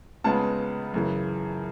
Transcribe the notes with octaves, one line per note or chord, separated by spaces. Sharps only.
C#2 C#3 G#3 B3 A5
F#2 C#3 E3